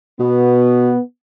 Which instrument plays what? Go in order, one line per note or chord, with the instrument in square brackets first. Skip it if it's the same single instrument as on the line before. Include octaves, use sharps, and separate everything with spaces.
[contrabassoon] B2 [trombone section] B3